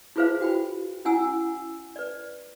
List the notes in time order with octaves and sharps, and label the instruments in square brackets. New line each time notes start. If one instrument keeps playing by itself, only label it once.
[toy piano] E4 F4 G#4 B4 C5 F5
F#4 G5 B5
C#4 E4 F#5 G#5 A#5 E6
B4 D5